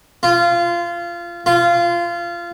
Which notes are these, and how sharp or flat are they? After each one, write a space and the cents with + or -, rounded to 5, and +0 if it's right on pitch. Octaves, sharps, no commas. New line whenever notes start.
F4 -20
F4 -20